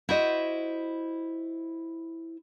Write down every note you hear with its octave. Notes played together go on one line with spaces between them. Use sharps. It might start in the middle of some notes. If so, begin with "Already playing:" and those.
E4 F#4 C5 D#5